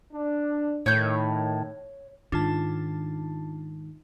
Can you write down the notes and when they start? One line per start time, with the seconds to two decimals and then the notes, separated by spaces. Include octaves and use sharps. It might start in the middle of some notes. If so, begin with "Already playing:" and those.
0.13 D4
0.86 A2 D#3 C#5 G6
2.32 G#2 D#3 D4 F4 A5